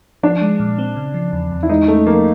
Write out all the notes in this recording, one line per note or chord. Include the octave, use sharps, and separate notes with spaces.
F3 D4
G#3
A#2
C4
C#3
F3
E2
E2
E4
G#3 D#4
A3 C#4
F3 A#3